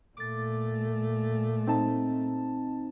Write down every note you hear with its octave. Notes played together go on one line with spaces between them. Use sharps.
A#2 A3 D6 A6
C4 D#4 A5